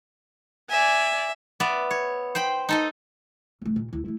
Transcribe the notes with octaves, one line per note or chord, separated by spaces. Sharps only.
D5 E5 G#5
B3 D5 E5
C#5
C5 G5 B5
D#4 A4 D#5
F1 A3
D#2 A#2
D2 E4
A3 E4